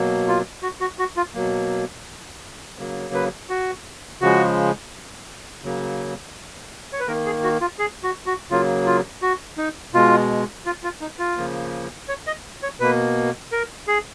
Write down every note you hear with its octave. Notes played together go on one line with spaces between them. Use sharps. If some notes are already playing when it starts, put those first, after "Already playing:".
Already playing: B2 F#3 A#3
F4
F#4
F#4
F#4
F4
B2 F#3 A#3
C#3 F#3 A#3
B4
F#4
C#3 F3 G#3 F#4
C#3 F#3 A#3
C#5
B4
D#3 A#3 A#4
G#4
F#4
F4
G#4
F#4
F#4
C#3 F#3 A#3 F4
F4
F#4
D#4
B2 G#3 F4
F4
F4
D#4
F4
C#3 F3 A#3
C#5
D#5
C#5
B2 A#3 B4
A#4
G#4